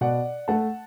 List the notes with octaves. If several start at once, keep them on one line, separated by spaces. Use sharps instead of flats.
B2 D5 F#5
A3 F#5 A5